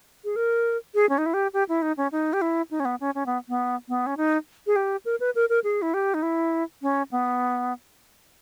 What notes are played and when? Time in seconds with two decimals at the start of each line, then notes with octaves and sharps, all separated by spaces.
0.24 G#4
0.36 A#4
0.95 G#4
1.09 C#4
1.18 D#4
1.26 E4
1.34 G4
1.53 G4
1.69 E4
1.82 D#4
1.97 C#4
2.12 D#4
2.33 G4
2.41 E4
2.71 D#4
2.80 C#4
2.85 B3
3.00 C#4
3.15 C#4
3.26 B3
3.49 B3
3.88 B3
4.06 C#4
4.17 D#4
4.67 G#4
4.76 G4
5.05 A#4
5.20 B4
5.35 A#4
5.49 A#4
5.64 G#4
5.82 E4
5.94 G4
6.14 D#4
6.22 E4
6.82 C#4
7.11 B3